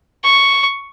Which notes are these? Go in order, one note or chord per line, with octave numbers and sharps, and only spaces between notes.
C#6